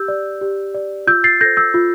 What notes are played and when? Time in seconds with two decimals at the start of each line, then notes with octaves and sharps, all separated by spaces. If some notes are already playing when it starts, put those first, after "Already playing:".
Already playing: G4 E6 G6
0.08 D5
0.41 G4
0.74 D5
1.07 F4 E6 G6
1.24 A6 C7
1.41 A4 G6 A#6
1.45 C5
1.57 E6 G6
1.74 F4